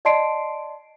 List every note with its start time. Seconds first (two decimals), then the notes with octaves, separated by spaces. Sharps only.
0.05 D5 D#5 A5 C6 C7 D7